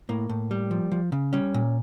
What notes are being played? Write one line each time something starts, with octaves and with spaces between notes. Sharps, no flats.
A2 A#3
A2
G3
F3
F3
C#3
G3 C#4
A#2